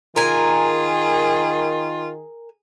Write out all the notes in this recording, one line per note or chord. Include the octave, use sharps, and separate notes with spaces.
D#3 F4 G#4 A#4 G#5